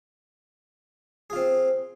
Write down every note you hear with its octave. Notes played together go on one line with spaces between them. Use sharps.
C4 F4 G#4